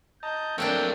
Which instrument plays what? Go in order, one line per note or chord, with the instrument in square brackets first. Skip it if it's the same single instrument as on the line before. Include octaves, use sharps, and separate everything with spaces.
[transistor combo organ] D#5 A5 A#5 [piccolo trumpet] G6
[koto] F#3 A#3 D4 [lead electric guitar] A3 C4 [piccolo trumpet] G5 [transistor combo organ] E6